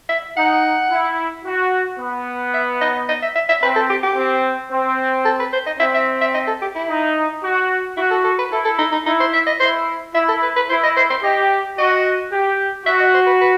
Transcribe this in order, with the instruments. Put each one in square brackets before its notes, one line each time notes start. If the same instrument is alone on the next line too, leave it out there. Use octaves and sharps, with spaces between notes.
[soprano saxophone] E5
[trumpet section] D#4 [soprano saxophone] F#5
[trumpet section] E4
F#4
B3
[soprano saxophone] E5
D#5
D#5
E5
E5
E5
[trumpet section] C4 [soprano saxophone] B4
[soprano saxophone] A4
G4
G4
[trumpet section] C4
C4
[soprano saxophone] A4
B4
C5
D#5
[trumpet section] C4 [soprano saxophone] E5
[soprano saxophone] E5
E5
D#5
A4
G4
E4
[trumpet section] D#4
F#4
[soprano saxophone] E4 [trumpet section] F#4
[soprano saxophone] A4
A4
B4
[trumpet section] E4 [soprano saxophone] A4
[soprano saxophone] A4
D#4
D#4
[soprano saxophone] D#4 [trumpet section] E4
[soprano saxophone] C5
E5
D#5
[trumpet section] E4 [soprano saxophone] C5
[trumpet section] E4 [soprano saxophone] E5
[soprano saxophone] A4
B4
B4
[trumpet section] E4 [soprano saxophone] C5
[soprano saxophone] D#5
C5
C5
[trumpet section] G4 [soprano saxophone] D#5
[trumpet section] F#4 [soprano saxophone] D#5
[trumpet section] G4
[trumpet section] F#4 [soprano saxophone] E5
[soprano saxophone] D#5
C5
B4
B4